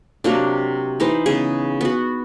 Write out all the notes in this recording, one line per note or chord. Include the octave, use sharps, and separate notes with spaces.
C3 F#3 A#3 D4
E3 D#4 B4 C5
C#3 B3 G#4
B3 F#4